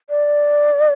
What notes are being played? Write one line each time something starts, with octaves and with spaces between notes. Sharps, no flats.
D5